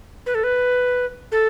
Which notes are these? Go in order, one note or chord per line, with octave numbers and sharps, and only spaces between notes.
B4
A4
B4
A4